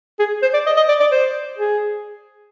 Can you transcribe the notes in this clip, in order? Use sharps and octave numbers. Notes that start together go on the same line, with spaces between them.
G#4
C5
D5
D#5
D#5
D5
D5
C5
G#4